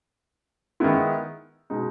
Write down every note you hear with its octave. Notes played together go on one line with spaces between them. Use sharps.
D#3 G#3 B3 E4
B2 G#3 D#4